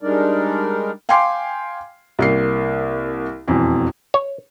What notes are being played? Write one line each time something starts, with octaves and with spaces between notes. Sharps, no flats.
G3 G#3 D4 D#4 A#4 D5
F5 G5 G#5 C6 D6 C7
C2 A#3 C7
E1 F2 E3
C#5